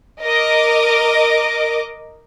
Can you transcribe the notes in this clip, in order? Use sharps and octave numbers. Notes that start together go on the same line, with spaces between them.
A#4 D#5 D6